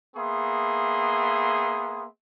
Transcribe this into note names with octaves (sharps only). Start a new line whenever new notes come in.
A#3 B3 G#4 E5 C6